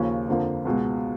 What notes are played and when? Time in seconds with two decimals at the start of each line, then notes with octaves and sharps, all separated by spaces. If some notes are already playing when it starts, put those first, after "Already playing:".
Already playing: D#2 C#3 F3 A#3 C#4
0.28 F2 D3 F3 A#3
0.65 C#2 B2 G#3